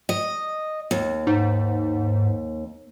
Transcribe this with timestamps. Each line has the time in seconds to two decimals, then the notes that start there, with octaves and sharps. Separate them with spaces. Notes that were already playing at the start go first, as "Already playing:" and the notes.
0.09 D#5
0.91 D#2
1.27 G#2